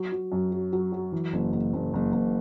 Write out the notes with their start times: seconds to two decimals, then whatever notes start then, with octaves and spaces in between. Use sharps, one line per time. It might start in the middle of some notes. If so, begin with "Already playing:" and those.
Already playing: F#3
0.12 F#3
0.32 F#2
0.52 F#3
0.73 F#3
0.92 F#3
1.12 E3
1.33 F#1
1.52 F#1
1.73 F#1
1.94 F#1
2.13 F#1